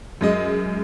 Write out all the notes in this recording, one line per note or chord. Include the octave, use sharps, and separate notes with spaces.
F#2 G#3 D#5